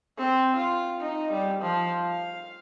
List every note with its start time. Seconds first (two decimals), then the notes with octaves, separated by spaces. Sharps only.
0.18 C4
0.57 F4
1.01 D#4
1.32 G3
1.62 F3
2.04 F5